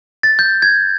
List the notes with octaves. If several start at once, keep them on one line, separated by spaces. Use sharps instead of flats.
A6
G6
G#6